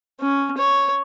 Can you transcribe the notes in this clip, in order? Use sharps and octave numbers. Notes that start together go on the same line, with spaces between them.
C#4
C#5